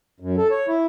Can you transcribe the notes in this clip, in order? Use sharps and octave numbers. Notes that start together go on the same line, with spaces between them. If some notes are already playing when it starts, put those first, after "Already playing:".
F#2
A4
C#5
E4